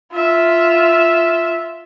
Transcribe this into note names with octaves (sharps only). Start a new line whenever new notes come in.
F4 E5